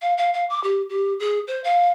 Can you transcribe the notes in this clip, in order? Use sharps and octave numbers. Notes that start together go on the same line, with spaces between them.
F5
F5
F5
D6
G4
G4
G#4
C5
F5